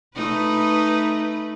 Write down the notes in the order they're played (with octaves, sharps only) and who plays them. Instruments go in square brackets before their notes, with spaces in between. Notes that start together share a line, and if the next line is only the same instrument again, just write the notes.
[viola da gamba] A3 D#4 B4